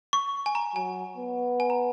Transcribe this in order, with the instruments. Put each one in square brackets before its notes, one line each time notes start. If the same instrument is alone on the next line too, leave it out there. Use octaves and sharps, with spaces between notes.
[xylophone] C#6
G#5
A#5
[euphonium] F#3 [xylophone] G#5
[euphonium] B3
[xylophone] G#5
A#5